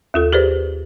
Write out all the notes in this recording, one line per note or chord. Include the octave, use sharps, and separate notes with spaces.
D#2 F4 A4
G4 G#4 B4 C5 D5